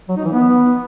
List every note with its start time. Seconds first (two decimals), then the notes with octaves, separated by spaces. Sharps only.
0.09 F#3
0.17 D#4
0.25 E3
0.33 B3